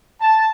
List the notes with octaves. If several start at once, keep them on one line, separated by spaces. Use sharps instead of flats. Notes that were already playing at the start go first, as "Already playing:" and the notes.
A5